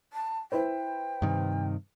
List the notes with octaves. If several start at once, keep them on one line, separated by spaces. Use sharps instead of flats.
A5
E4 B4 C5 G5
G2 C3 D#3